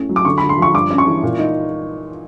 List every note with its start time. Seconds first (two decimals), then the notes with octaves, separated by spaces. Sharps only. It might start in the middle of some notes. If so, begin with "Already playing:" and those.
Already playing: A2 C#4
0.09 F#3
0.16 D6
0.25 D3 C#6
0.38 D3 B5
0.49 C6
0.58 F3 C#6
0.73 G2 D6
0.90 C#4
0.98 C#6
1.06 E3
1.23 A#2
1.39 D#4